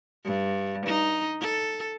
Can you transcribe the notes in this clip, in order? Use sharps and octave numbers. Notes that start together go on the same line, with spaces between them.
G2
D#4
A4